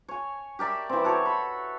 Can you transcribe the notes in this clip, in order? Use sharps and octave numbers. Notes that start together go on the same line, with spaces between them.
C#5 G#5
G4 A#4 D5 E5
E3 C4
F#4 A4 C#5
B5